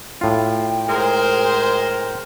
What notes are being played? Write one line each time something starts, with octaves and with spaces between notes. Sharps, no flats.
A2 F4 G5
G#3 A#4 C5